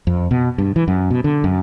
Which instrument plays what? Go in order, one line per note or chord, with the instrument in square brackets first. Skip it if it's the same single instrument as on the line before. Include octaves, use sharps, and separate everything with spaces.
[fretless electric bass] F2
B2
G2
E3
F#2
B2
D3
F#2